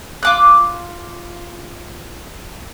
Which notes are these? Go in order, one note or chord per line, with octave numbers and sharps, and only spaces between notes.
F4 D6 F#6